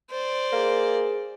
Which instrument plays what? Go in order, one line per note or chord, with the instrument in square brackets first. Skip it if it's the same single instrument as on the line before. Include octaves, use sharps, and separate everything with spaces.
[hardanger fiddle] C5 D5
[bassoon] A#3 [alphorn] G#4